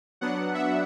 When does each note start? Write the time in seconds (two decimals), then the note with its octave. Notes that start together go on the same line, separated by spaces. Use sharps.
0.21 F#3 B3 D4 F#5
0.54 E5